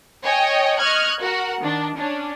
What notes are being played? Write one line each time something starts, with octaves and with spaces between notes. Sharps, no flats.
C#5 D#5 G5 G#5
D#5 C#6 F6 F#6 G#6
F#4 A#4 F#5
D#3 D4
C#4 D4